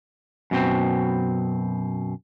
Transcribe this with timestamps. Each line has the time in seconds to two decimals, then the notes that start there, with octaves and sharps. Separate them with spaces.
0.51 F#2 B2 C4